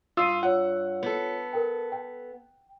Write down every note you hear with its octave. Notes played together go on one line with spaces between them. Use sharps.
G2 F4 D#6 E6 C7 D#7
F4 C#5 F#5
B3 A4
A#4 G5
G5